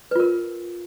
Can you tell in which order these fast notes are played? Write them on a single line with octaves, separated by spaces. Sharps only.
B4 F4 A#4